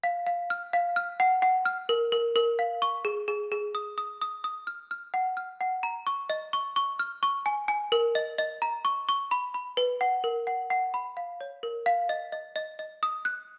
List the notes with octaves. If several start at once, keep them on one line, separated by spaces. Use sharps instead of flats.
F5
F5
F6
F5
F6
F#5
F#5
F6
A#4
A#4
A#4
F5
C#6
G#4
G#4
G#4
D#6
D#6
D#6
D#6
F6
F6
F#5
F6
F#5
A#5
C#6
D#5
C#6
C#6
F6
C#6
G#5
G#5
A#4
D#5
D#5
A#5
C#6
C#6
B5
B5
B4
F#5
A#4
F#5
F#5
B5
F5
C#5
A#4
F5
D#5
D#5
D#5
D#5
D#6
F#6